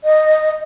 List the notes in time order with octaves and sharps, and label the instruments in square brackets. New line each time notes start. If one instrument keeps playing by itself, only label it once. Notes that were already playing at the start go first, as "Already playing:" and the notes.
[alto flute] D#5